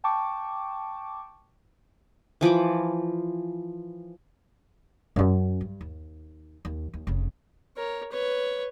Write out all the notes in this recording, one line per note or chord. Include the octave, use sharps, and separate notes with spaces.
G5 A5 C#6 D6
E3 F3 B5 D6
F#2 C#4
G2
D#2
D#2
D#2
F1 C#3
A#4 C#5
B4 C#5